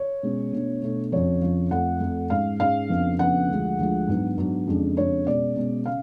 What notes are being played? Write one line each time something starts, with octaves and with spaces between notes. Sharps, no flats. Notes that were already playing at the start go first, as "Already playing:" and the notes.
Already playing: C#5
B2 G#3 C#4
B2 A3 D4
B2 A3 D4
F2 C#3 F3 C#5
F2 C#3 F3
F2 F3 A3 F#5
F2 F3 A3
G#2 G#3 C#4 F5
G#2 G#3 C#4 F5
F2 C#3 F3 B3 D4
F2 C#3 F3 B3 D4 F#5
D2 D3 F3 G#3
D2 D3 F3 G#3
G#2 F#3 B3 D4
G#2 F#3 B3 D4
F2 C#3 G#3 D4
F2 C#3 G#3 D4 C#5
B2 G#3 C#4 D5
B2 G#3 C#4
C#3 F5